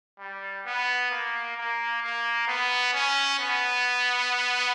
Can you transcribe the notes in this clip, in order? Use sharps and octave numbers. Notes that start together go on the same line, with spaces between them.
G3
B3
A#3
A#3
A#3
B3
C#4
B3